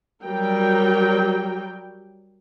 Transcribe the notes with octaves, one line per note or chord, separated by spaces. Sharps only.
F#3 G3 A#4 G5